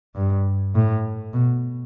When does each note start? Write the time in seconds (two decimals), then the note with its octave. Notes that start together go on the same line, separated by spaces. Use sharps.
0.15 G2
0.75 A2
1.34 B2